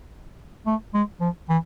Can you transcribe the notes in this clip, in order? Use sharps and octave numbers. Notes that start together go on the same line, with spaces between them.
A3
G#3
F3
E3